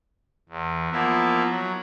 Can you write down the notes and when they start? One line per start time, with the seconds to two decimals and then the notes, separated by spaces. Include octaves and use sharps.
0.49 E2
0.92 F3 A#3 B3 E4
1.50 F#3